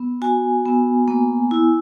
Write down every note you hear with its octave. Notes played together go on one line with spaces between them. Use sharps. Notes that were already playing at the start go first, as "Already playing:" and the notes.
Already playing: B3
F#4 G#5
B3
A#3
E4